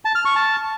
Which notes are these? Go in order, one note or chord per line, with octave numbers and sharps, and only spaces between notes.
A5
F6
C#6
A5